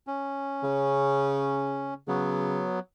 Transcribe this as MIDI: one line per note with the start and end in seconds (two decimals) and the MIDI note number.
0.07 1.94 61
0.64 2.01 49
2.08 2.66 49
2.08 2.79 54
2.08 2.79 59